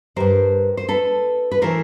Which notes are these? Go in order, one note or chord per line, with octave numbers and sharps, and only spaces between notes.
G2 D#3 G3 A#4 C5
C5
A4 B4
B4
E3 A3 A#4 C5